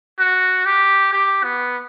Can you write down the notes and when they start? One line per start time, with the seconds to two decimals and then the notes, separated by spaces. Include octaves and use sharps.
0.19 F#4
0.66 G4
1.13 G4
1.44 B3